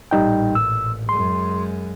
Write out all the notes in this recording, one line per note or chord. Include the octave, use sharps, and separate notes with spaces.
A1 A#2 G3 D#4 G5
E6
F#2 G#3 C6